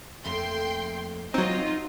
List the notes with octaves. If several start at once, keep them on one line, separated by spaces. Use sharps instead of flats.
F2 A3 A#3 G5 C6
F#3 C4 D#4 F4 F#4 D#5